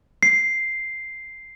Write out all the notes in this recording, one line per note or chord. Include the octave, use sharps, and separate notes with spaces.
C7